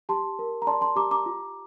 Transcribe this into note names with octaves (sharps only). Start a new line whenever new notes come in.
G4 A5 C6
A#4
A#5
D5 A5 C6
A5 C6
G4 A#5 D6
A#5 D6
F4